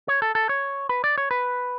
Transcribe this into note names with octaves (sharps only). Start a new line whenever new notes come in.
C#5
A4
A4
C#5
B4
D5
C#5
B4